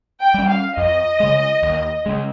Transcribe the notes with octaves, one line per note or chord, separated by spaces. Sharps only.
G5
G3 C#4
F5
F2 D#5
C#3 G#3
D#2
C#3 G#3